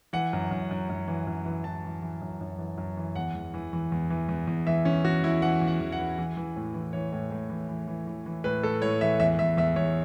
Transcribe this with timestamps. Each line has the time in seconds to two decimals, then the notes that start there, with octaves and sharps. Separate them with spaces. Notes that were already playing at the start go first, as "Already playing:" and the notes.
0.13 E3 F#5
0.33 F#2
0.51 F#2
0.71 F#2
0.89 F#2
1.08 E3
1.27 F#2
1.46 E3
1.64 E3 A5
1.84 E3
2.02 E3
2.22 F#2
2.41 F#2
2.58 E3
2.78 F#2
2.97 E3
3.15 E2 F#5
3.35 E2
3.54 E3
3.73 E3
3.92 E2
4.10 E3
4.29 E2
4.47 E2
4.67 E3 E5
4.85 E2 C#4
5.04 E2 F#4
5.23 E2 E4
5.42 E3 F#5
5.61 E2
5.68 F#5
5.81 E2
5.92 F#5
5.99 E3
6.18 E3
6.37 E3
6.56 A2
6.74 E3
6.93 E3 C#5
7.13 A2
7.31 A2
7.50 E3
7.68 E3
7.87 E3
8.07 E3
8.26 E3
8.44 A2 B4
8.63 A2 A4
8.82 A2 C#5
9.01 E3 E5
9.20 E2 E5
9.39 E2 E5
9.57 E2 E5
9.76 E2 C#5